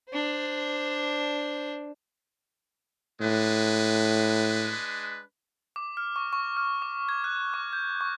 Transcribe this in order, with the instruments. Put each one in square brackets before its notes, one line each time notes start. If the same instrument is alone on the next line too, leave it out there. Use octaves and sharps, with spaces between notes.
[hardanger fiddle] D4 C5
[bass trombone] A2 [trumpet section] G#3 D4 B4
[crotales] D6
F6
C#6
C#6
F6
D6
G#6
F#6
C#6
G6
C#6